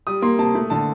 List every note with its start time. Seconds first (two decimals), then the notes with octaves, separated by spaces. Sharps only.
0.07 G3 D#6
0.22 A#3 C6
0.38 C3 A5
0.55 A3
0.70 D3 A5